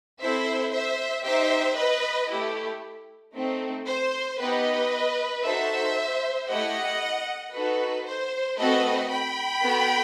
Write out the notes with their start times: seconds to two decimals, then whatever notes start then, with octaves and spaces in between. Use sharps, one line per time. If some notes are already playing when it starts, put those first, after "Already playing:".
0.21 C4 E4 A4 C5 E5
0.73 C5 E5
1.25 D#4 G4 C5 E5
1.77 B4 D#5
2.30 A3 E4 G4
3.35 A3 C4 D#4
3.87 C5
4.40 B3 D#4 G4 B4 D#5
5.44 D#4 F#4 A4 C5 E5
6.48 A3 E4 G4 D#5 F#5
7.53 D#4 F#4 A4 B4
8.07 C5
8.59 A3 C4 F#4 A4 B4 D#5
9.11 G5 B5
9.63 B3 F#4 A4